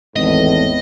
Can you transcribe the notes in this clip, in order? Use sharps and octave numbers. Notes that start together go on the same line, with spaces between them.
G#1 E2 A2 D#5